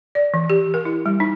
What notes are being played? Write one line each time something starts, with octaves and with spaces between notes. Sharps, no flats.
D5
E3
G4
A#4
E4
G3
D#4